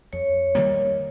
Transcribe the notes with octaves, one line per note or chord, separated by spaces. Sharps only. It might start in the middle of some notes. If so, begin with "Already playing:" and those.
F2 C#5
D#3 G3 A#3